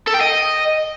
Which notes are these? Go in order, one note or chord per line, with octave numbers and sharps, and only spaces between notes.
A4
G5
D#5